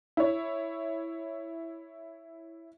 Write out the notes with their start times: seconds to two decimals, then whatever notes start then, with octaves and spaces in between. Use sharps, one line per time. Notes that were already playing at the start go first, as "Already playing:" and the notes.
0.17 E4 C#5